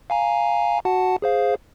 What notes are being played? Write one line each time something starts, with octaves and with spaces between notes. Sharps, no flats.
F5 G#5 A#5
F#4 F#5 A5
G#4 C5 F5